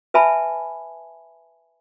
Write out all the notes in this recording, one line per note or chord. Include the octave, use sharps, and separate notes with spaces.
B4 E5 G#5 A5 B5